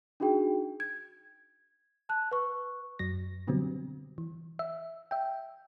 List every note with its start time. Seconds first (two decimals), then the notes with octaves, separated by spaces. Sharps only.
0.20 D4 D#4 F#4 G#4 G5
0.80 G#6
2.09 A5 F#6
2.31 B4 C#6
2.99 F#2 F#3 A#6
3.47 B2 D3 F#3 G3 B3 C4
4.18 E3
4.59 E5
5.11 E5 G5